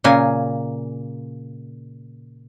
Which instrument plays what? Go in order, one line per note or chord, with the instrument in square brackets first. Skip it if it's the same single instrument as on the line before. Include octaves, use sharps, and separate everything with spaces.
[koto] A#2 C#3 A#3 G#5